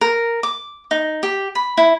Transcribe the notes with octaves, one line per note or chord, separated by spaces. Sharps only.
A#4
D6
D#4
G4
B5
E4